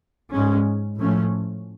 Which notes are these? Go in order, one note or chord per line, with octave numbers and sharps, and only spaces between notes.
G#2 G#3 C#4
A2 F3 A3 C#4